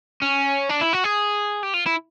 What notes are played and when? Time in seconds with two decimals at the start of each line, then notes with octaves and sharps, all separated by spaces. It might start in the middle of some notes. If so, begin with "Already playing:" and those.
0.22 C#4
0.70 D4
0.81 E4
0.93 F#4
1.04 G#4
1.63 G4
1.74 F4
1.87 E4